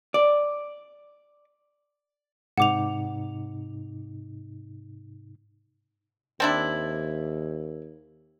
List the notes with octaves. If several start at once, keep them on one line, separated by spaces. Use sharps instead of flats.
D5
G#2 C3 D#4 F#5 D6 F7
D#2 C4 D4 E4